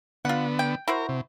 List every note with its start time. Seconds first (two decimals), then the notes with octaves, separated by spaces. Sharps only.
0.25 D3 B3 F4 F#5
0.59 G5
0.88 E4 F#4 A#4 C5
1.09 C3